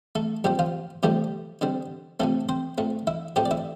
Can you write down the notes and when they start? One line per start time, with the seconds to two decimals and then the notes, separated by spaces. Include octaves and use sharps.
0.15 A3 A4
0.44 A#2 F3 G3 C4 G4
0.59 F3 F4
1.03 C3 F3 G3 A3 C4 G4
1.61 D3 G3 C4
2.20 C3 F3 A3 C4 A4
2.49 C4 C5
2.78 A#2 A3 C4
3.07 E4 E5
3.36 A2 F3 A3 C4 G4 G5
3.46 D5
3.51 E4 E5